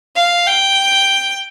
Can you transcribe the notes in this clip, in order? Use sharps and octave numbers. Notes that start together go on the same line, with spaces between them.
F5
G5